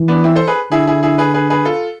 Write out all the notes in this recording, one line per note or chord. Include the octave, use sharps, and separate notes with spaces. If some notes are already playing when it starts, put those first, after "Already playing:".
Already playing: E3
B3 D4
C4 E4
A4 C5
G#4 B4
D3 E4 G#4
E4 G#4
E4 G#4
G#4 B4
G#4 B4
G#4 B4
F4 A4